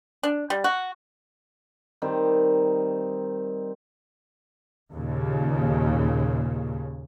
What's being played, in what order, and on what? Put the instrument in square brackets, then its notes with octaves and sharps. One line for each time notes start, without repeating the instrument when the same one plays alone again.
[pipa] D4
G3
F#4
[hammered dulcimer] D#3 G3 C4
[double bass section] D#2 A#2 C#3